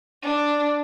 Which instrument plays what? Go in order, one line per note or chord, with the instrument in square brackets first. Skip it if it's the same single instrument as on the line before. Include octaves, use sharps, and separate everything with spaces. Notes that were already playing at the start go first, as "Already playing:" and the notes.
[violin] D4